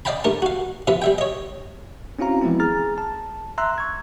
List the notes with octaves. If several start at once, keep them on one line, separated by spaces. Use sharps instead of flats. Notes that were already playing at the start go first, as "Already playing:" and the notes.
D5 D#5 F5 G5 A5 B5
G2 A3 A#4 A5
F#4 F5
C3 F3 B4 E5
G3 E5 G5
C#5 D#5
C4 C#4 E4 F#4 F5 A#5
E3 F3 G#3 B3 C4 E4
G#4 A#5 F6 A6
A5
E5 A#5 C6 E6 F#6
C#6 G#6